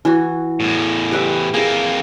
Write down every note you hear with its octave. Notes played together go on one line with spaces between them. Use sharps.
E3 F#4
E2 A2
G4 B4 E5
F2 A#3 G#4 E5